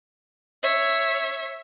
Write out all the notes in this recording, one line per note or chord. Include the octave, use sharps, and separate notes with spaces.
C#5 E5